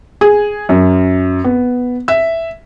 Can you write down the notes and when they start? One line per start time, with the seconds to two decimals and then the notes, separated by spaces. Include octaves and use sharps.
0.21 G#4
0.69 F#2
1.44 B3
2.08 E5